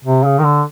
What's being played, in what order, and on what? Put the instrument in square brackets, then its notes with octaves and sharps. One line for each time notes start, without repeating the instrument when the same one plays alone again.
[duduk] C3
C#3
D#3
D3